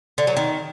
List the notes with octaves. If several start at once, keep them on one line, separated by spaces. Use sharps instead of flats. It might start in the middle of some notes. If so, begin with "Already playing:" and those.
D3
F#3
D#3